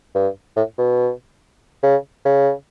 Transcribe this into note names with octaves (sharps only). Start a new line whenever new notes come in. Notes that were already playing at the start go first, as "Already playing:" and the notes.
G2
A2
B2
C#3
C#3